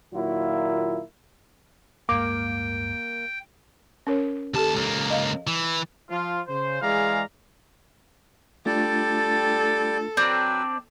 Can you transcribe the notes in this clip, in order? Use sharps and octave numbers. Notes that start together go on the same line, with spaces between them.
A#2 D#3 F#3 A#3 E4 F4
D1 G2 G#3 A#3 G5 D6
C#4 A#4 C#5
D#2 G4 A4 A5
C#2 A#3
D#5 F5
E3
F3 F4
C#3 C5
E3 G#3 G#4 D5 F5 A#5
G3 A3 D4 F4 A4 D5 G5
F#3 C4 D4 B4 E6